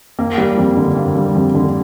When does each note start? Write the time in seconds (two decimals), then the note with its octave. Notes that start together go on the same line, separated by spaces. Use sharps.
0.19 A#3
0.38 G3
0.58 F2
0.77 D3
0.96 A#3
1.16 G3
1.35 F2
1.55 D3